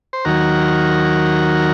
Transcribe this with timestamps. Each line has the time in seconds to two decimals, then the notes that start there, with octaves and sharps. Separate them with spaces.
0.13 C5
0.25 D#2 D#3 F#3 F#4 A#4